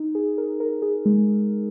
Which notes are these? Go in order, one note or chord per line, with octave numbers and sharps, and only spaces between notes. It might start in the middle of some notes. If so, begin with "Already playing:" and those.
Already playing: D#4
G#4
A#4
A#4
G#4
G#3